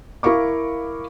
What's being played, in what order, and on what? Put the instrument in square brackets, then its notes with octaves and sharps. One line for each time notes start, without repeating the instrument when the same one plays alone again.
[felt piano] E4 A#4 F5 C#6 D6